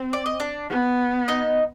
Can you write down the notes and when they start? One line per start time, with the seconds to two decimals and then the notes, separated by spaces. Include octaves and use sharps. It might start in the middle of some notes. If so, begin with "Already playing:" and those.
Already playing: C4
0.13 D5
0.26 D#5
0.40 D4 D5
0.70 B3
1.28 D#4 D#5